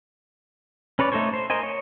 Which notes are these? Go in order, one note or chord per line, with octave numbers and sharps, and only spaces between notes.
C#4 B4 C#5 D5
A3 D#4 A4 C5 C#5
C5
A#4 C5 D#5 G#5
C#5